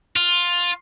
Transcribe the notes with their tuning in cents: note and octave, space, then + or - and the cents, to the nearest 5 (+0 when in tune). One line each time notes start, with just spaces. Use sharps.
F4 +10